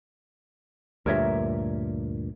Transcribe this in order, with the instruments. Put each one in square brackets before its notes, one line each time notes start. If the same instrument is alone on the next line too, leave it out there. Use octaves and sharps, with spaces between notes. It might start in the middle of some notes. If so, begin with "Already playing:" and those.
[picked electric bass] D2 G2 A#2 [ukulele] A#4 C#5 E5